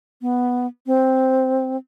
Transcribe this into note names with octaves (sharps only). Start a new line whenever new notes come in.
B3
C4